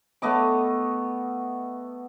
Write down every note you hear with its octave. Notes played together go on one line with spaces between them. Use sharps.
A3 B3 D#5 D6